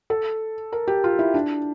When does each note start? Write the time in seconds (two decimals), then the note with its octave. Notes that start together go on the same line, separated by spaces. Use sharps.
0.10 A4
0.72 A#4
0.88 G4
1.04 F4
1.19 E4
1.34 D4